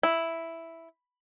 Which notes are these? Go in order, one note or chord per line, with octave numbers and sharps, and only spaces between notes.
E4